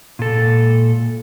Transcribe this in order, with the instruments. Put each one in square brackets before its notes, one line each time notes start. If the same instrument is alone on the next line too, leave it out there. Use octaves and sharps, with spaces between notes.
[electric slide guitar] A#2 A4